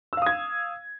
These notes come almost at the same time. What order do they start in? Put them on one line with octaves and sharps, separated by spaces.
E6 F5 D#6 G#6